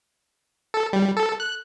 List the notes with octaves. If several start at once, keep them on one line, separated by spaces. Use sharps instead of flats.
A4
G3
A4
F#6